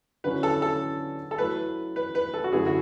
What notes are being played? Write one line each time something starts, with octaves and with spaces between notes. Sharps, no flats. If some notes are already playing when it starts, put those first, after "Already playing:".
D3 F#3 C#4 E4 B4
A4
A4
A4
F#3 A3 E4 B4
B4
B4
A4
F#4
F#2 D3 A3 E4 G#4 B4
F#4